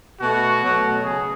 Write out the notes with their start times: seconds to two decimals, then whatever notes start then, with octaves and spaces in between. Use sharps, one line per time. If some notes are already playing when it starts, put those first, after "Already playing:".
0.20 B2 A3 F#4
0.62 B2 F#3 A3
1.05 C#3 G#4